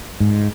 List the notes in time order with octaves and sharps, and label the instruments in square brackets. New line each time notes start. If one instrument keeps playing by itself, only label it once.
[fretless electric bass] G#2